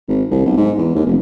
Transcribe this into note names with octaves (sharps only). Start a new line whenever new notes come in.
G#1
C2
B1
G#2
E2
D#2
F1